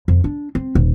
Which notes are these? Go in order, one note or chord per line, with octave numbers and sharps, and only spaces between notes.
F2
D4
C4
D#1